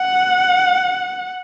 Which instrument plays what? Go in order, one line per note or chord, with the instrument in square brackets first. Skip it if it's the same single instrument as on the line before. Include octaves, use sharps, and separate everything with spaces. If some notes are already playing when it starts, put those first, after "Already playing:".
Already playing: [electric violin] F#5